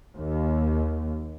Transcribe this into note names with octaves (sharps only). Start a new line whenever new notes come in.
D#2